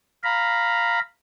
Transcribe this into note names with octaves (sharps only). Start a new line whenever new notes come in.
F5 A#5 B5